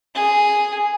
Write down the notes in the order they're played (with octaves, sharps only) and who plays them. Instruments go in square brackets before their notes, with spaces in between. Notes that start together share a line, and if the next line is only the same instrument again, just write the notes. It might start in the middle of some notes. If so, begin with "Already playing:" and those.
[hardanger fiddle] G#4